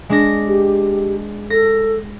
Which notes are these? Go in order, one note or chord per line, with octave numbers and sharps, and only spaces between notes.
G#3 D4 A#6
G4
A4 A#6